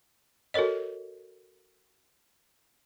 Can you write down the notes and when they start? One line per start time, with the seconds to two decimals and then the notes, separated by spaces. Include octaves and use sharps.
0.54 F#4 A4 A#4 C#5 D#5